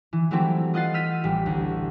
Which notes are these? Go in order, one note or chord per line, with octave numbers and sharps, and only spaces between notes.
E3
E3 F#3 G3 A3 C4 E4
F4 D#5 F#5 A6 C7
E6 F6 G6 B6 D#7
A1 G3
D2